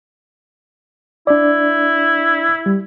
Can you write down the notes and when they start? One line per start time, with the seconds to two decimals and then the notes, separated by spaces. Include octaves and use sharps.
1.27 D4 E4 D5
2.66 G3